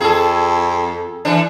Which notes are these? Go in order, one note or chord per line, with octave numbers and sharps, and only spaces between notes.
F2 G#4 A4
E3 D4